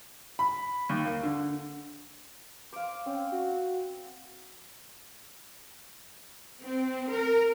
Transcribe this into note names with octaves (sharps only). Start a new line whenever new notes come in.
B5
D#2
A#3
D3
C5 F5 D6
C4 C#4
F#4
C4
A#4